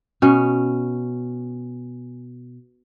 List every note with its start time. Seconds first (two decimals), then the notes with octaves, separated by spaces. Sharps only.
0.22 B2 C#4